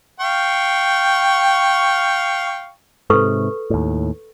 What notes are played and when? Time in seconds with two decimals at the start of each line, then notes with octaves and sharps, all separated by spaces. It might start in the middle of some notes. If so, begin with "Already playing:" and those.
0.20 F5 G5 C#6
3.10 G#2 C3 A4 B4 C#6
3.70 D#2 A2